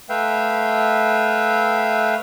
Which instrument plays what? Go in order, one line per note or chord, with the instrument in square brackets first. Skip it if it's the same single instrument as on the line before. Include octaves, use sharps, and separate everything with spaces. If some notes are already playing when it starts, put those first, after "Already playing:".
[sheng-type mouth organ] A3 B4 E5 F5 G5